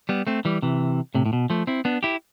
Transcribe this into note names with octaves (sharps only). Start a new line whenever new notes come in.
G3 B3
A3 C4
E3 G3
C3 E3
A2 C3
A2
B2
F3 A3
C4 E4
B3 D4
E4 G4